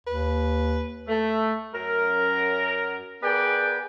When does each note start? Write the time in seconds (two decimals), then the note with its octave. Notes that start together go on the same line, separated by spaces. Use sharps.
0.07 D#2 B4
1.08 A3
1.74 F#2 A#4
3.22 B3 G#4 A#4 B4 D5 G5